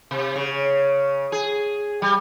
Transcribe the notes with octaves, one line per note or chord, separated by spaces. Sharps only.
C3
C#3
G#4
G3